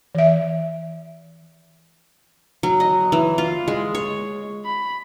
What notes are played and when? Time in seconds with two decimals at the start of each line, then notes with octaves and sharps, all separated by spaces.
0.15 E3 E5
2.63 F#3
2.80 D#5
3.12 E3
3.38 F4
3.68 G#3
3.95 C#5
4.66 B5